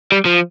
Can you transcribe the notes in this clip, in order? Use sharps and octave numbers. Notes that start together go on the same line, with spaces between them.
G3
F3